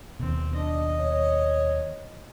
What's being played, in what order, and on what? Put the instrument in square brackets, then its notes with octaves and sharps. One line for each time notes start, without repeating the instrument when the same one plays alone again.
[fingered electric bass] D#2 B2 [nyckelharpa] C4
[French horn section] D4 [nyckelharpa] D#5
[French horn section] C#5